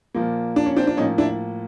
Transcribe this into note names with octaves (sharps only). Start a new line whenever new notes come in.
A#2 F3 A#3
D4
C#4
C4 D4
D4
A2 F3 A#3 C#4 D#4
D4 E4